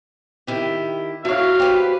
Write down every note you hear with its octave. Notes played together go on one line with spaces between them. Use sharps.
D#3 E4 G4
F#3 E4 F#4 C#5 F5
G4 B4 C5